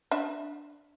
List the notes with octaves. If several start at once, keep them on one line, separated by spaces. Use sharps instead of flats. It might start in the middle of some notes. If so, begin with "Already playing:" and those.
D4 E5